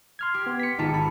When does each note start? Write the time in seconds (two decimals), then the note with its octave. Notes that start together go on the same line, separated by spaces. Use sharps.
0.19 C6 F6 G#6
0.34 G4
0.46 B3
0.60 B6 C#7
0.79 G#1 D#4 F4 G#4 A5
0.94 B5